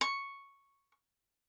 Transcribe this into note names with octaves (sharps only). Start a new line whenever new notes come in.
C#6